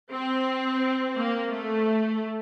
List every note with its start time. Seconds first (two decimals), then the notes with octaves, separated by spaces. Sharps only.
0.11 C4
1.16 A#3
1.51 A3